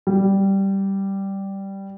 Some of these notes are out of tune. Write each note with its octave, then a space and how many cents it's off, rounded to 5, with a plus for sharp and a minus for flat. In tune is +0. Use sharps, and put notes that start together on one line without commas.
G3 -5